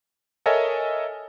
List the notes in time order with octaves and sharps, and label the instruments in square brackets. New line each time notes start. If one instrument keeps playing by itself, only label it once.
[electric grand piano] A4 A#4 C#5 D#5 E5 G#5